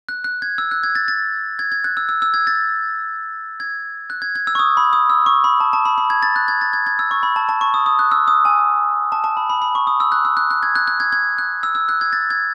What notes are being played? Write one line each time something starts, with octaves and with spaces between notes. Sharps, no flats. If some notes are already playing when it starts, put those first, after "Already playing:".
F#6
F#6
G#6
E6
F#6
G#6
A6
A6
G#6
G#6
F#6
E6
E6
E6
G#6
A6
G#6
F#6
G#6
G#6
E6
C#6
D#6
B5
D#6
E6
C#6
B5
A5
A5
B5
B5
G#6
A6
F#6
G#6
A6
G#6
G#6
E6
C#6
B5
A5
A5
C#6
D#6
D#6
F#6
E6
D#6
G#5
A5
A5
B5
B5
B5
C#6
D#6
E6
F#6
E6
F#6
F#6
G#6
F#6
F#6
G#6
G#6
F#6
E6
E6
F#6
G#6
A6
G#6